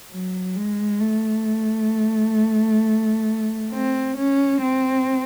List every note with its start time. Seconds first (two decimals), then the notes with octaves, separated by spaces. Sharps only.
0.11 F#3
0.56 G#3
1.01 A3
3.72 C4
4.17 C#4
4.62 C4